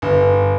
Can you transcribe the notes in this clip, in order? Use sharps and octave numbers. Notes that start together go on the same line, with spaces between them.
G1